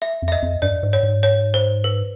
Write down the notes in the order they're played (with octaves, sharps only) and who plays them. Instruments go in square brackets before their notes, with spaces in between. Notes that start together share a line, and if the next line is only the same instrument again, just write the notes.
[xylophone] E5
[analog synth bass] F2
[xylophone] E5
D#5
[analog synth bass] F2
[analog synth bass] G2 [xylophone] D5
[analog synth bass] G#2
[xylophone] C#5
[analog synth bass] G#2
[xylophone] C#5
C5
B4